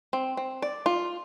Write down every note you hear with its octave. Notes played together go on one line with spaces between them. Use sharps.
C4
C4
D5
F4